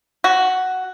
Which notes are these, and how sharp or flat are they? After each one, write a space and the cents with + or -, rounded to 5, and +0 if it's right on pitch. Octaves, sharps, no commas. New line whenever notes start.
F#4 +5